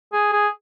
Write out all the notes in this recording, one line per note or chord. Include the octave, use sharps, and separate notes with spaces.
G#4
G#4